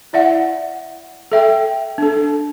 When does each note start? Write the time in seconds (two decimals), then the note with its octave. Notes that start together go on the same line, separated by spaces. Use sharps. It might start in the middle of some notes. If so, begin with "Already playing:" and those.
0.13 E4 D5 E5 F#5
1.32 A4 E5 G5
1.98 D4 A4